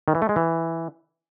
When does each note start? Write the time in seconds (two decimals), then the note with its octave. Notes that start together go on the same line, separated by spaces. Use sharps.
0.08 D#3
0.15 E3
0.22 A3
0.29 G#3
0.36 E3